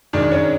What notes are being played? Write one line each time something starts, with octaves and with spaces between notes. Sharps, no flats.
F#2 D#3 G#3 D4 D5
C#4 C#5